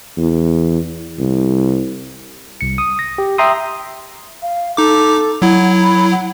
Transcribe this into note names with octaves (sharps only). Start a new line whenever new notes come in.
E2
C2
C2 C#7
D#6
A#6
G4
E5 G5 A#5 C6 D#6
F5
D#4 A4 D6
F#3 E4 F#5
B5
F#5